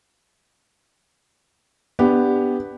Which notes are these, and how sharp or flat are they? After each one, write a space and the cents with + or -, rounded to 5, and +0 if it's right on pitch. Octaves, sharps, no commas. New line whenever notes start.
B3 +5 D4 +0 G4 +5